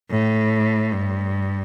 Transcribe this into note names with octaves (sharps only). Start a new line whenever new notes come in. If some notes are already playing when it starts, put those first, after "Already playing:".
A2
G2